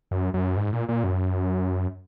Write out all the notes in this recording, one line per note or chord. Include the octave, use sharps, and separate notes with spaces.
F#2
F#2
G#2
A#2
A#2
F#2